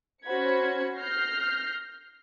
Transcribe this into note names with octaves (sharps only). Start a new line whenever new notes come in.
C#4 F#4 C5 B5 G#6 C#7
F6 G6 A#6 C7